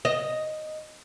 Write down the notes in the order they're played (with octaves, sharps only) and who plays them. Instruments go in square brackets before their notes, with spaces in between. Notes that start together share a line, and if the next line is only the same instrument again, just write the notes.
[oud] D#5